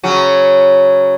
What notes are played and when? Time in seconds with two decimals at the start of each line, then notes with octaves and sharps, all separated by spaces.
0.04 C#3 F#3 C#4